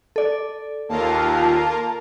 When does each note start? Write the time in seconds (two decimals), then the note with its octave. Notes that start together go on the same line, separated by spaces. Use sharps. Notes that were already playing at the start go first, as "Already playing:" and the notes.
0.16 A4 D5
0.89 D#2 A#3 F4 A#4 A5